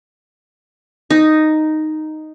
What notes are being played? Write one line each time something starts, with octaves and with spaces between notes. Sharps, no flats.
D#4